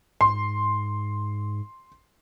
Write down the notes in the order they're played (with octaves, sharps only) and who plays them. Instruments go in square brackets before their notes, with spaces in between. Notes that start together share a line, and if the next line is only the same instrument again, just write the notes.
[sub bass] G#2 [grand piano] C6